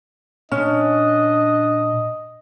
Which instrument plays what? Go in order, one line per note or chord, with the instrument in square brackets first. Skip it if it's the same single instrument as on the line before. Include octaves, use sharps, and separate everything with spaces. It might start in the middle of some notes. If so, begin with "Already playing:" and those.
[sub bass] A#2 [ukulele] C#4 [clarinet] D4 [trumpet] D#5